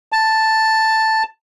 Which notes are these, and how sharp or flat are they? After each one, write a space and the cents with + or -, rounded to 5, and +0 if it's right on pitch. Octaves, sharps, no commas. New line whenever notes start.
A5 +5